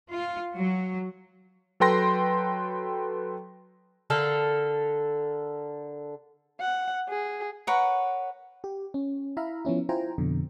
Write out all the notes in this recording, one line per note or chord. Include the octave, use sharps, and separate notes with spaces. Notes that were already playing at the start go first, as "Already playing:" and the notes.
F4
F#3
F#3 A4 B4 G5 C6 A#6
D3 A4 A#4 F5
F#5
G#4
A#4 B4 C#5 F#5
G4
C#4
E4 E5 F5 A#5 B5
F3 B3 C#4 E4
E4 F4 C5 G5 G#5 A#5
F2 B2 D3